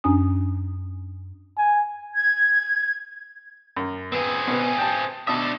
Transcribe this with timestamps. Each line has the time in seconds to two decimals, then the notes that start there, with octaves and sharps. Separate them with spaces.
0.04 F#2 C#4 D4 G#5 D#6
1.57 G#5
2.15 G#6
3.76 F#2
4.12 B3 C4 G#4
4.48 B2 B4
4.78 G5 A5
5.27 B2 D4 E5 A5 D#6